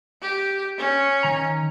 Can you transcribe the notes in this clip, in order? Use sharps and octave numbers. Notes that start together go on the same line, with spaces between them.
G4
C#4
D#3 A#5